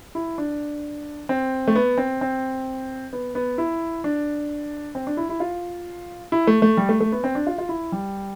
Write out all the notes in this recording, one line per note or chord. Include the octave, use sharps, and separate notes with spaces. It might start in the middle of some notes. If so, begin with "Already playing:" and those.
E4
D4
C4
A3
B3
C4
C4
B3
B3
E4
D4
C4
D4
E4
E4
F4
E4
A3
A3
G3
A3
A3
B3
C4
D4
F4
F4
E4
G3